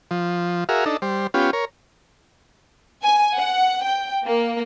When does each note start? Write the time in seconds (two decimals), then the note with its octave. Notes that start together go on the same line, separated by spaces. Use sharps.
0.11 F3
0.69 F#4 G#4 A#4 E5 F5
0.86 D4 D#4 A4
1.02 G3 C5
1.34 B3 C#4 F4 G4
1.53 A#4 C#5
3.03 G#5
3.36 F#5
3.83 G5
4.25 A#3